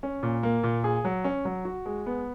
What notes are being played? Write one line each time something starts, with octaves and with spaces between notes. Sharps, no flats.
C#4
A#2
A#3
A#2
G#4
F#3
C#4
F#3
F#4
G#3
B3